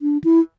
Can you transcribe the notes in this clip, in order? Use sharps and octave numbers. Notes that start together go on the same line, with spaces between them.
D4
E4